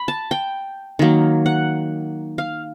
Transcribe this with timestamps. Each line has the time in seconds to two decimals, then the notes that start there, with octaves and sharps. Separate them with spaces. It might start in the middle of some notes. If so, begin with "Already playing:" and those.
Already playing: B5
0.08 A5
0.31 G5
0.99 D#3 F#3 A#3
1.46 F#5
2.38 F5